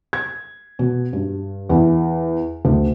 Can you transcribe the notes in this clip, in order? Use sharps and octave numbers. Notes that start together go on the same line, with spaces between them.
G#6
B2
G2
E2
D2